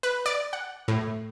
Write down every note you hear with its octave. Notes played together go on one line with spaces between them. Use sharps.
B4
D5
F#5
A2